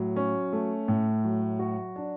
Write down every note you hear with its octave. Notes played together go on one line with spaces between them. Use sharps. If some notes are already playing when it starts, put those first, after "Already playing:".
Already playing: A2 F#3
C#4
A3
A2
F#3
F#4
D4